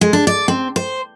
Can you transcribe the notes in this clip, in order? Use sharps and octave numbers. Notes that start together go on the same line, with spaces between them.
G#3
D4
D5
C4
C5